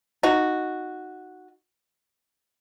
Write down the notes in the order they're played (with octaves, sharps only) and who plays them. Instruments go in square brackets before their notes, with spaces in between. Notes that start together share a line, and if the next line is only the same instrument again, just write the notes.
[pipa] D#4 F#4